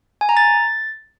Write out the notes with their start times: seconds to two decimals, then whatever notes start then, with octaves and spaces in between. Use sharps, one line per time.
0.21 G#5
0.29 A#5
0.37 A6